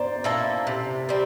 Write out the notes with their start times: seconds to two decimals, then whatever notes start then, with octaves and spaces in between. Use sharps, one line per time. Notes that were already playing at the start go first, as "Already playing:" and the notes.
Already playing: C5 D5 A#5
0.24 A#3 E4 A4
0.67 C3
1.09 G3 C4